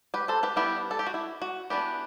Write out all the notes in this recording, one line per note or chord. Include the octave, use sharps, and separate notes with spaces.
G4 B4
A4 C5
G4 B4
G3 B3 D4 E4 G4
A4
G4
F#4
E4
F#4
E3 B3 D4 G4 B4